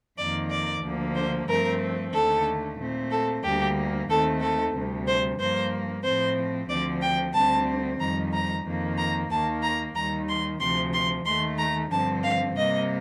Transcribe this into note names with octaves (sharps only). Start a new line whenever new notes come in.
F2 D#3 A#3 D5
D5
D2 D3 F3 A#3
C5
G2 F3 A3 C4 A#4
D#2 D3 A3 A4
A#2 A3 C4
A4
D2 D3 G3 A#3 G4
D#2 D#3 A3 C4 A4
A4
D2 C3 G3
C5
G2 F3 A#3 C5
A2 F3 C4 C5
D2 D3 F3 C4 D5
G5
D2 D3 G3 C4 A5
F2 D#3 G3 A#5
A#5
F2 D#3 A#3
A#5
D#2 D#3 A#3 A5
A#5
D#2 D#3 G3 A#5
C6
D2 C3 F3 C6
C6
D#2 D#3 A3 C6
A#5
G2 D3 F3 C4 A5
F5
C3 G3 A#3 D#5